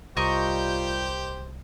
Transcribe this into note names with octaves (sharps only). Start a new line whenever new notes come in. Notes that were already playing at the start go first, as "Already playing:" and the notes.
C2 G3 F4 G4 A#4 C5 D#5 C#6